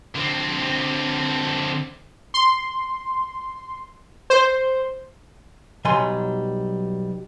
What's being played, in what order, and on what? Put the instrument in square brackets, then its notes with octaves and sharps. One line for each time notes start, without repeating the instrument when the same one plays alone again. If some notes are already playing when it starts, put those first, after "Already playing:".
[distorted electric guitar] D3 C4
[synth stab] C6
C5
[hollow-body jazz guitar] B1 F#3 G3 G#5 C6